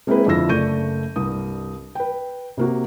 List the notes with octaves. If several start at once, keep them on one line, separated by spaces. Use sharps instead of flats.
G#3 A#3 C4 E4 G#4 B4
F2 D3 E4 F4 E6 A#6
F#1 A3 D5 C#6 G6 D#7
C2 G2 D#6
B4 G5
C3 A#3 F#4